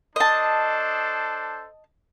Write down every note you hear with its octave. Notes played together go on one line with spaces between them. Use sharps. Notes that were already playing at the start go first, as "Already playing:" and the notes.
D4 A4 C5 D#5 A5